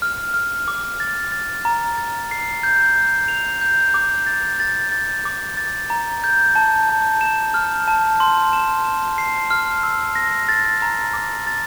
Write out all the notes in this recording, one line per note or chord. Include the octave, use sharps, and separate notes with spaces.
F6
F6
D6
A6
A6
A#5
A6
C7
G6
G6
F7
G6
D6
A6
A6
A6
D6
A6
A#5
G6
A5
A5
E7
F6
A5
C6
E7
E7
C7
F6
E6
A#6
A6
A#5
D6
A6